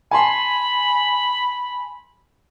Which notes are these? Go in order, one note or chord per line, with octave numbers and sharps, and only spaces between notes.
G#5 A5 B5 C6